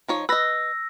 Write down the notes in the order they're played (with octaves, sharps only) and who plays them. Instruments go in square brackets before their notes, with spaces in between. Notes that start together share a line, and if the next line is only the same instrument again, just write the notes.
[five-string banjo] F3 D#4 C#5
[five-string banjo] B4 D#5 [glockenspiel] E6 A#6